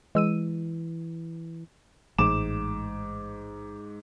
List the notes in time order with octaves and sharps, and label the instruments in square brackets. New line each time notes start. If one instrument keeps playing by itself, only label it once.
[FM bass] E3 [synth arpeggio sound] G#3 E6 D#7
[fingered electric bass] A1 G#3 [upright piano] G#2 D6 E7